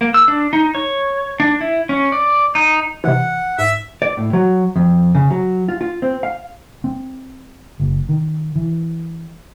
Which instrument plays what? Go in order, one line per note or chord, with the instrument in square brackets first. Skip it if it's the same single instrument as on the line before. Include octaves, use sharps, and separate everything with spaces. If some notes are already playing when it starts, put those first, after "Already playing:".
[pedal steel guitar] A#3
E6
D4
D#4
C#5
D4
E4
C#4
D5
D#4
[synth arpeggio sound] C3 E4 [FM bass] E3 [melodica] F#5
[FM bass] G#2 [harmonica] E5
[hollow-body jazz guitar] D5
A2
F#3
F2
C#3
F#3
F4
F4
C4
F5
[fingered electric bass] C4
F#1
D#3
E3